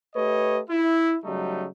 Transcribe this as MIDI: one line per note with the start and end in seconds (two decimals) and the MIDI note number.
0.15 0.59 57
0.15 0.59 67
0.15 0.59 71
0.15 0.59 73
0.15 0.59 75
0.70 1.15 64
1.24 1.66 49
1.24 1.66 54
1.24 1.66 55
1.24 1.66 57
1.24 1.66 63